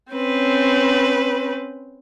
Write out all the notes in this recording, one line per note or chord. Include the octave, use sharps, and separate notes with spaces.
C4 C#4 B4